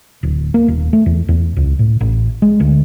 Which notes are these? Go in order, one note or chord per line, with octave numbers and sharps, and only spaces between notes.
D1
A#3
D#1
A3
E2
E2
C#2
A2
A1
G#3
D2